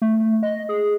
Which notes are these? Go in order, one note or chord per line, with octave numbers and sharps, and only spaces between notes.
A3
D#5
G#4